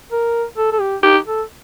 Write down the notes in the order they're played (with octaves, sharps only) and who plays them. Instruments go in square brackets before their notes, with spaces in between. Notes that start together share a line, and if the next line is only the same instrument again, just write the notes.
[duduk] A#4
A4
A4
G4
[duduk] D#4 [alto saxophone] G4
[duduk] A4